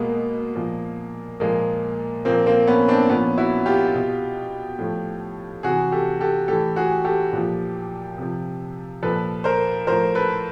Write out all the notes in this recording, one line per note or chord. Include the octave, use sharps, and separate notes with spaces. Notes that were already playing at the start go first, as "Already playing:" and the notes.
Already playing: B2 G#3 A#3
A#2 F3
A#2 F3 G#3 A#3
A#2 F3 A#3 C4
A#3 C4
B3 C#4
C4 D4
A#2 F3 B3 C#4
E4 F#4
F4 G4
B2
A2 F3
C3 E3 F#4 G#4
G4 A4
G4 A4
A2 E3 G4 A4
F#4 G#4
G4 A4
A#2 F3
C3 F3
A#2 F3 A4 B4
A#4 C5
A2 F3 A#4 C5
A4 B4